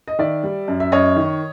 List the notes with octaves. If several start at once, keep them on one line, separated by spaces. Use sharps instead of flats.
D#5
D#3 D5 E5
G3
F#2
E5
F#2 C#5 D#5
D#3